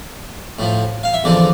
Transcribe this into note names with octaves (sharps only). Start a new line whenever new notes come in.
A2 F3
F5
E5
E2 D3 F3 D5